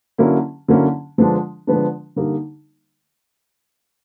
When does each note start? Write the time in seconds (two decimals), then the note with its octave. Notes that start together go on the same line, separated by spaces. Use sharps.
0.18 D3 F#3 A#3 C#4 E4
0.68 D3 F#3 A#3 C#4 E4
1.18 D3 F3 G#3 B3 D4
1.67 D3 F3 G#3 B3 D4
2.16 D3 G3 A#3 D#4